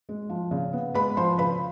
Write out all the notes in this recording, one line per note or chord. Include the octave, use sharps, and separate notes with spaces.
G#3
F3
C#3
B3
G#3 B4 B5
F3 C5 C6
C#3 B4 B5